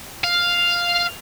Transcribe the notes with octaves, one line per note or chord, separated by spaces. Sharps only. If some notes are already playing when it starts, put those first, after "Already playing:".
F5